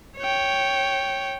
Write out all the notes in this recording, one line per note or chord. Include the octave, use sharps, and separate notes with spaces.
C#5 G5